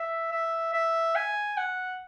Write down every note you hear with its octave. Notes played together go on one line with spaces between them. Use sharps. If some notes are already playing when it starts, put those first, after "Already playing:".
Already playing: E5
E5
E5
G#5
F#5